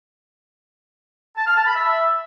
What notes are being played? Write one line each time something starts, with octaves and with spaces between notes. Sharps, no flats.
A5
F6
A5
B5
E5